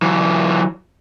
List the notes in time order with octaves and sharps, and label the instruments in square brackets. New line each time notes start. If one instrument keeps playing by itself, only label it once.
[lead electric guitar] E3 F#3